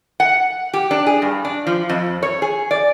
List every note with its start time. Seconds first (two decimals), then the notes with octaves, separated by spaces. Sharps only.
0.20 F#5
0.73 G4
0.91 D4
1.06 G#4
1.22 G2
1.45 D4
1.67 F3
1.89 F2
2.23 C#5
2.42 G#4
2.71 D5